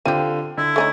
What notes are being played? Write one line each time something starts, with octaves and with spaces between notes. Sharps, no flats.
D3 C4 F4 G4 D#7
D3 E4
A3 C#4 D#4